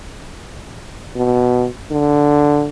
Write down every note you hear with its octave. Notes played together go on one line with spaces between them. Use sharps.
B2
D3